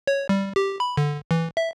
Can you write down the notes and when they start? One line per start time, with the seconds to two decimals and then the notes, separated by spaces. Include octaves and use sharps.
0.07 C#5
0.29 G3
0.56 G4
0.80 B5
0.97 D3
1.31 E3
1.57 E5